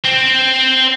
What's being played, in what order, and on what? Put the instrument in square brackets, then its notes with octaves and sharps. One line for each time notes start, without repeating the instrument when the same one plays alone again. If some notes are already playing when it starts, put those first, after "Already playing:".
[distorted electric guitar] C4